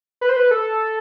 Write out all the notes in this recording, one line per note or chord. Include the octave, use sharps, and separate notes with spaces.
B4
C5
B4
A4